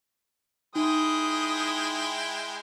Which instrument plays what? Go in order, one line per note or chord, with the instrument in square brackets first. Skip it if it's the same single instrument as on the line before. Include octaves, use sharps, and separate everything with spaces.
[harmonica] G#3 E4 G5 [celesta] D#4 [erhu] D#6